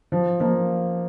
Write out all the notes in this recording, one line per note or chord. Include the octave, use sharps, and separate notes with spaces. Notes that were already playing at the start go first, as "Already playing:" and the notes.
F3
F3 A#3